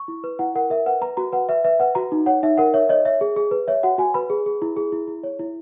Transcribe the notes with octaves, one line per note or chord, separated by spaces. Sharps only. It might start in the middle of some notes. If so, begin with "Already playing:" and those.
Already playing: C#6
E4
B4
E4 F#5
A#4 F#5
A#4 E5
B4 F#5
B4 A#5
F#4 A#5
B4 F#5
B4 E5
B4 E5
B4 F#5
F#4 A#5
D#4
C#5 F#5
D#4 E5
A#4 F#5
C#5 E5
C#5 D#5
C#5 E5
G#4
G#4
B4
C#5 E5
F#4 F#5
F#4 G#5
B4 B5
G#4
G#4
E4
G#4
E4
E4
C#5
E4